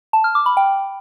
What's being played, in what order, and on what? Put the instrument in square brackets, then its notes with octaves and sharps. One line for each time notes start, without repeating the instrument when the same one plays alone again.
[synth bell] A5
F6
D6
B5
G5